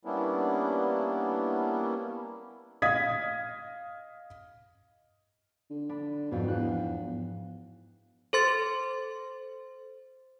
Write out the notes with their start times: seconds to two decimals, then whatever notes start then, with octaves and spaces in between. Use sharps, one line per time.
0.05 G3 A#3 B3 C#4 D4 E4
2.82 D#5 F5 D#6 G#6 B6
5.70 D3
5.89 D4 B5
6.31 F2 G#2 B2
6.48 E2 F#6
8.33 A4 C5 C6 A6